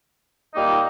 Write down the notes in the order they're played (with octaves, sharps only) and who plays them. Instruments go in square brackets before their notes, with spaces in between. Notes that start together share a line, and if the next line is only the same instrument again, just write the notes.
[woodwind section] A#2 G3 A#3 D#4